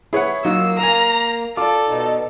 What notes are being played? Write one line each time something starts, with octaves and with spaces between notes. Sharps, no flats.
E4 G#4 B4 C#5 F#5
F#3 A#3 D#4 F4 F#4 E6
A#4 F5 G#5 A#5
F4 A4 D5 D6
B2 D#4